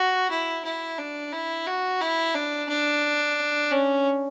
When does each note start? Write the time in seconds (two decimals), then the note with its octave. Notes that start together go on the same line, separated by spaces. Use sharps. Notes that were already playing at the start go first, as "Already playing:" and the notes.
Already playing: F#4
0.30 E4
0.64 E4
0.98 D4
1.32 E4
1.66 F#4
2.01 E4
2.34 D4
2.69 D4
3.71 C#4